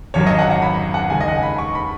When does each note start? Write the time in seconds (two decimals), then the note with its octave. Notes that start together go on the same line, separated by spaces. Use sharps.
0.14 G#1 F#2 F#3 C#5
0.27 D#5
0.39 F#5
0.51 F#5
0.62 B5
0.94 F#5
1.10 D#2 C#3 G#3 G#5
1.20 D#5
1.28 F#5
1.35 G#5
1.43 B5
1.58 C#6
1.75 B5